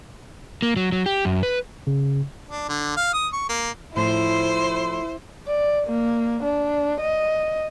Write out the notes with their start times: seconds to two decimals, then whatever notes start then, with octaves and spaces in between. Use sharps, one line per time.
0.62 A#3
0.76 F#3
0.92 F#3
1.06 G4
1.25 F#2
1.43 B4
1.87 C#3
2.49 D4
2.69 D3
2.97 F5
3.14 D#6
3.33 C#6
3.49 A#3
3.97 A2 F3 C4 E4 C5 C6
5.47 D5
5.87 A#3
6.43 D4
7.01 D#5